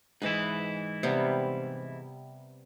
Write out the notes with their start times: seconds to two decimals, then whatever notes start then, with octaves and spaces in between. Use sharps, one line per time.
0.22 G#2 E3 E4 B4 D#5
1.03 C3 G3 B3